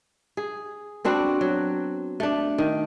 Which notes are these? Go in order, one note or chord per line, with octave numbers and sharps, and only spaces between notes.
G#4
B3 C4 D4 F#4
F#3
A3 D4
D#3